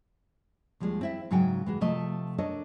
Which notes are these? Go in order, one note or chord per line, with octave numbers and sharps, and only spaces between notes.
D#2 F3 G3 G#3
C4 E4 E5
G#2 C#3 F#3 F#4 G5 G#5
E3 G#3 F#4
C3 F3 A3 D#5
D4 A4 A#4 C#5 D#5